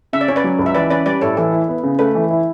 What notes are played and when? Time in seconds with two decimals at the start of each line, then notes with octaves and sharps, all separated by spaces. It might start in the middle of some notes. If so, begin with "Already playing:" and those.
0.13 C#3 E5
0.21 D5
0.28 C#4 C#5
0.36 B4 D5
0.44 F#3
0.59 C#2
0.66 E5
0.75 E3 B4 D5
0.90 C#4 B4 D5
1.06 G3 B4 D5
1.21 A2 A4 C#5
1.37 E3 A4
1.52 E4
1.68 B3
1.83 C#3
1.99 A3 B4
2.15 E3
2.31 E4